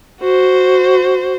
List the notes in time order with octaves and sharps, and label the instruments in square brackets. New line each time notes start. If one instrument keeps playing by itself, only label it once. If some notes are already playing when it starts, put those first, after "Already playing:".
[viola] F#4 C5